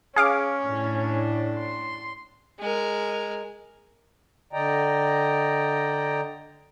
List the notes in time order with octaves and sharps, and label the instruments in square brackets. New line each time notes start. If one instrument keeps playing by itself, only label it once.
[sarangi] C#4 [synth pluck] G#4 F5 D6
[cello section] A2 D4
[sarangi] C6
[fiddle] G#3 A#4
[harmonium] D3 D5 D#5 G5 A#5